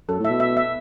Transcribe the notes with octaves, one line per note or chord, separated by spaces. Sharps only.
F#2 A4
A2
E5
B2
E5
E5